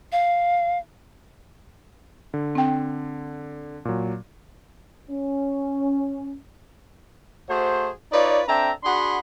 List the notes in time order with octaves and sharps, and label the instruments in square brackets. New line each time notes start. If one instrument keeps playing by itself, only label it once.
[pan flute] F5
[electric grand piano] D3
[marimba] C4 G5
[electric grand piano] A#2 F#3
[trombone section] C#4
[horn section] A3 F#4 G#4 C5
D#4 F4 B4 C#5 D5
C4 D4 A4 E5 G5 A#5
D4 F#4 G#4 F#5 B5 C6